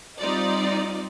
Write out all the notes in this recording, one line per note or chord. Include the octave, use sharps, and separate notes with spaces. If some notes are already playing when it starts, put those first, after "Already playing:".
G3 C4 D#4 F4 D5 D#5